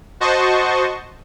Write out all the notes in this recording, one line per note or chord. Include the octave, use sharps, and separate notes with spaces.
F#4 C5 D#5 A5 C#6